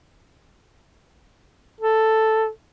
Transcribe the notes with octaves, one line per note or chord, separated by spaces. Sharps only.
A4